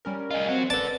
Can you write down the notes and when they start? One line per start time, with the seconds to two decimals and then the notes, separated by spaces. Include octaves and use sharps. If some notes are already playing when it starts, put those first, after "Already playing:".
0.05 G3 C#4 A#4
0.31 F4 G#4 D#5
0.48 F#3 C4 F#4
0.70 A4 B4 D5 A5